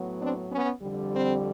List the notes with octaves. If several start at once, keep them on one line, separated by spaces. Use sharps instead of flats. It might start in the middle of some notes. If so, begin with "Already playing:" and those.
Already playing: A2 F#3 B3
C4 D4
B3 C#4
F2 D3 G3
C4